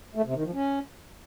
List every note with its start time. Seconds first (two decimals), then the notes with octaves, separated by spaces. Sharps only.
0.15 A3
0.25 C3
0.35 D#3
0.44 F3
0.54 C#4